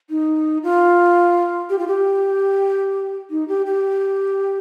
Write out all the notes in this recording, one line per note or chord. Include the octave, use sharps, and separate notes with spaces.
D#4
F4
G4
F4
G4
D#4
G4
G4